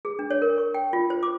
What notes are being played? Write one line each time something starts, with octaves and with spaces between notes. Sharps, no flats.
G#4
D4
C#5
A#4
C#6
G5
F4
C5
D6